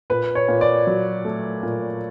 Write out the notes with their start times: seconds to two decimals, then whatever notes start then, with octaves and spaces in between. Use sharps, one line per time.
0.10 A#2 B4
0.35 C#5
0.48 A#2
0.61 D5
0.87 F#3
1.25 A3
1.63 A#2